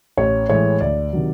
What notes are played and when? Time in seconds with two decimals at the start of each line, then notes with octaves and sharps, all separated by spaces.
0.17 A1 C#5
0.49 A2 E3 G#3 C#5
0.81 D2 D5
1.13 C3 D#3 F#3